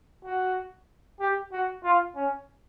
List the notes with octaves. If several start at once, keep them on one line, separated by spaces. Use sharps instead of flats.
F#4
G4
F#4
F4
C#4